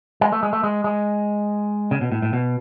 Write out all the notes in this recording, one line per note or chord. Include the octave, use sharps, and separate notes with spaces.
G#3
A3
G#3
A3
G#3
G#3
C#3
B2
A2
A2
B2